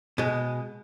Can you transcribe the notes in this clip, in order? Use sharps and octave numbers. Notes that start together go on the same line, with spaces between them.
B2 G#3